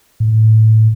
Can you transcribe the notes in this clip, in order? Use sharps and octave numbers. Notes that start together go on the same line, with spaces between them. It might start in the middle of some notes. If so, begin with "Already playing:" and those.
A2